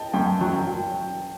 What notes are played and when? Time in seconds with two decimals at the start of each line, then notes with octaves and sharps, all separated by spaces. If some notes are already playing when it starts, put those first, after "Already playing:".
Already playing: D#5 G5 A5
0.13 F#2 G5
0.41 F#3
0.54 G5